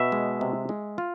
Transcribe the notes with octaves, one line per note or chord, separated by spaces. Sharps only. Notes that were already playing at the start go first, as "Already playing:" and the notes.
Already playing: B2 E5
G#3
C3
G#3
F4